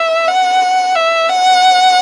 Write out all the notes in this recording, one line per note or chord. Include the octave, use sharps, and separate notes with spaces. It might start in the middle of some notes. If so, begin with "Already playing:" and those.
Already playing: E5
F#5
E5
F#5